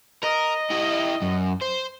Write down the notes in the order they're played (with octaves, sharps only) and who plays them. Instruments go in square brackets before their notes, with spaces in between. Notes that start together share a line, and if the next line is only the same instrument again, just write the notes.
[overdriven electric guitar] A#4 [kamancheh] D#5
[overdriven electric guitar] E4 G4
F#2
C5